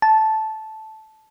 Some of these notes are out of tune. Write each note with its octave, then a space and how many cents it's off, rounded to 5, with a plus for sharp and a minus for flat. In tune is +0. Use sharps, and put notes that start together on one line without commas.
A5 -10